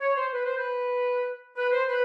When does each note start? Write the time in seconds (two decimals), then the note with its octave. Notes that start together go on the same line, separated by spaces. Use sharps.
0.01 C#5
0.16 C5
0.33 B4
0.45 C5
0.57 B4
1.57 B4
1.72 C5
1.88 B4